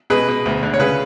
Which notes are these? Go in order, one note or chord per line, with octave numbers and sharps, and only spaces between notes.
B2 G#4 B4
B2
D2
D3
C#5
C#3 G#4 B4